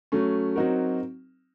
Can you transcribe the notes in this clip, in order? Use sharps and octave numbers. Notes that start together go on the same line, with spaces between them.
F#3 A3 C#4
F#3 C4 D#4 F#4 A#4